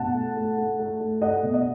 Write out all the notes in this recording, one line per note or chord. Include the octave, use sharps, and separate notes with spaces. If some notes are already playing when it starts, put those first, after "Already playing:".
Already playing: B2 F#5 A5
A3
A3
A3
A3
A3
A3 D#5 F#5
B2
D#5